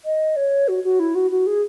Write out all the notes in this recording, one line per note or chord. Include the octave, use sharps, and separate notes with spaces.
D#5
C#5
F#4
F#4
E4
F#4
F#4
G#4